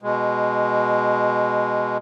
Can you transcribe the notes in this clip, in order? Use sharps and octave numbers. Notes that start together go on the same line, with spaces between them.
B2 G#3